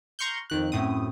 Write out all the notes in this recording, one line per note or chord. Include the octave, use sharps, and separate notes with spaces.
A#5 C6 C#6 F6 G6
F2 D#3 F#6
F#2 A2 C4 D#6